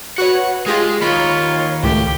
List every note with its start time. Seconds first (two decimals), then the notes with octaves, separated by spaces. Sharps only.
0.18 F#4 B4 C#5 F#5
0.66 G#3 F4 G4 G#4
1.01 D#3 A#3 F4 C#5 B5
1.83 C#2 A2 G4